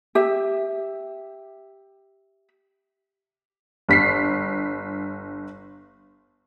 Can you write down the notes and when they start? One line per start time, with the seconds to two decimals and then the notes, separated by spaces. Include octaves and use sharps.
0.15 G4 E5
3.89 G1 B6 C7